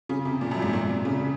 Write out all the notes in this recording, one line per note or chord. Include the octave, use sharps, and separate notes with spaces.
C#3
C3
A#2
F#2
G#2
A#2
C3
C#3